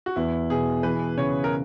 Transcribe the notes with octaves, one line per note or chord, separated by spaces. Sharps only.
F#4
E2 E4
B2 G#4
E3 B4
C#3 C#5
A#4